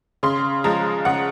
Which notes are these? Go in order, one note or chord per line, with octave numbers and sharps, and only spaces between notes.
C#3 C6
F3 G#3 A#5
C#3 F#5